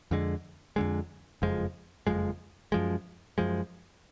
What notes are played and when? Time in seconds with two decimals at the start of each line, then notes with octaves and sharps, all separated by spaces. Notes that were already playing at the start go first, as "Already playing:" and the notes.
0.11 F2 D3 G#3
0.76 F2 D3 G#3
1.42 F#1 F2 F3 G#3
2.07 F#1 F2 F3 G#3
2.72 F#2 F3 G#3
3.38 F#2 F3 G#3